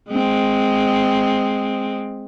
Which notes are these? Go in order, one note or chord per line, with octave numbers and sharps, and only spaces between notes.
G#3 C4